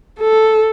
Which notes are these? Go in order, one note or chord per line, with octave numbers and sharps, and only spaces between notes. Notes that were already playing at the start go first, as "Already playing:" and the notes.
A4